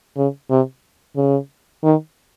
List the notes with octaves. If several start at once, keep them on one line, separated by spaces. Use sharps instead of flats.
C#3
C3
C#3
D#3